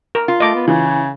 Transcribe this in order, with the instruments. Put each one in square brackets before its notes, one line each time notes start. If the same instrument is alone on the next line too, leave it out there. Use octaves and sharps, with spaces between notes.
[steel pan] A#4
[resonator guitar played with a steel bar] F4
[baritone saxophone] A3 [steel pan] D#5 D6
[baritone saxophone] B3
[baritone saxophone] C#3 [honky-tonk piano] E3